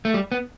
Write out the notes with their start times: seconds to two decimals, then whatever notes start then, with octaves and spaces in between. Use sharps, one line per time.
0.05 A3
0.14 G3
0.32 B3